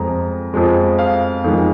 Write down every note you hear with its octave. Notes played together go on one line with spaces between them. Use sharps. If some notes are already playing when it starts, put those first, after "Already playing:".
Already playing: F2 F3 G#3 A#5
F2 F3 G#3
F5
F2 D#3 G#3